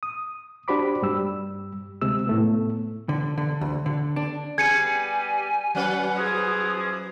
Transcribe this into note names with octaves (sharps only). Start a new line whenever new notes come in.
D#6
D4 F#4 G4 C5 B5 D6
G2 G3 E6
D2 C3 G#3 E6
A2 A3 B3
D3
D3
D2
D3
D4
G3 B3 G#4 G#5 G#6 C#7 D#7
F#3 C#4 B4 F#5 G#5
E3 F3 G#4 D#6